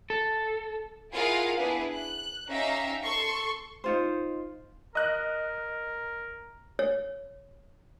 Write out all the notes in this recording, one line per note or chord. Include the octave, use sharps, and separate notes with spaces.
A4
E4 F4 G#4 A#4 F5 F#5
B3 D4 E4 G#4 B4
F#6
C#4 D#4 G4 E5 F5 A#5
A4 C6 C#6
D#4 F4 C5
A#4 D#5 F#6
C#5